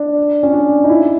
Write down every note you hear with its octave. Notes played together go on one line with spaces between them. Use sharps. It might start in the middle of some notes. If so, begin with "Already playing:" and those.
Already playing: D4
C#4
D4
D#4
E4